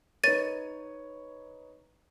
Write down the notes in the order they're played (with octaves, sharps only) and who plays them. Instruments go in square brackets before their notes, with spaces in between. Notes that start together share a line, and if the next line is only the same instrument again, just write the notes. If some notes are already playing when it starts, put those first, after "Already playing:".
[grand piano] D#4 B4 C#5 [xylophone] A6 D#7